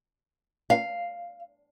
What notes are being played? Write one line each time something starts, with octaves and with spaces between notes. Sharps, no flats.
F5